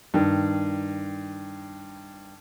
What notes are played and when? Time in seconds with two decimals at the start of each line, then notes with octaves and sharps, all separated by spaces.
0.14 G2 D#3